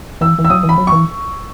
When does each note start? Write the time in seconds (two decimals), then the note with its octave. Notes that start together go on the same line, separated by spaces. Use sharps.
0.21 E3 E6
0.39 E3
0.45 E6
0.50 F#3 D#6
0.63 E3
0.69 B5
0.78 F#3
0.87 E3 C#6